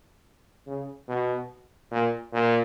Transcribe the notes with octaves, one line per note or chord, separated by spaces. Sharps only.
C#3
B2
A#2
A#2